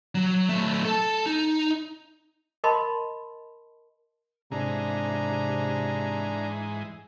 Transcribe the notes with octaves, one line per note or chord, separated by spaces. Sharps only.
F#3
F#3 A3
A4 A5
D#4
A#4 D#5 A5 B5 C6
G#2 C3 E3 G#3 D4 A#5